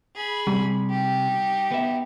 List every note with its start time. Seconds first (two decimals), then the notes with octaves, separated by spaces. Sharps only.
0.16 G#4 B5
0.47 C3 G3
0.90 D#4 G4
1.71 B3 E5